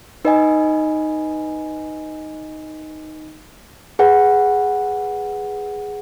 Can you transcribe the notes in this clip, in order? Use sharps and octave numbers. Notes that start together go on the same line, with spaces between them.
D#4 B4 D#5 G#5
G#4 B4 F#5